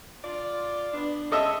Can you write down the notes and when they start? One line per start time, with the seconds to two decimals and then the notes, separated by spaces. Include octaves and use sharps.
0.24 F4 D5
0.93 B3 D4
1.31 G#3 C#4 A4 D#5 E5